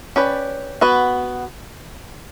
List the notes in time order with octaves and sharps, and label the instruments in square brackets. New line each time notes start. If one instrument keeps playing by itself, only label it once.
[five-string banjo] C#4 G4 B4 D5
B3 F#4 B4